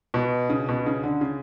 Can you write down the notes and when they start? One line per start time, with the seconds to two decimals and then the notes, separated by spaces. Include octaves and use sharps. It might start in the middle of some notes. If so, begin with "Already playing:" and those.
0.14 B2
0.50 C#3
0.69 B2
0.86 C#3
1.04 D3
1.21 C#3